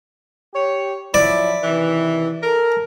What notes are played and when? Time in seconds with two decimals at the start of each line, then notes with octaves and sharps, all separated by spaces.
0.54 G4 C#5
1.14 F3 F#3 E4 D5
1.63 C3 D#3 E3
2.43 A4 A#4